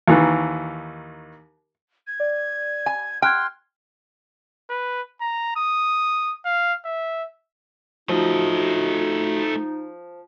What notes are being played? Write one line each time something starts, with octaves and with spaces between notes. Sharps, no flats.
D#2 D#3 E3
G#6
D5
G#5
G5 C6 F6 F#6 G#6
B4
A#5
D#6
F5
E5
F3 A3 D#4 F#4 D#5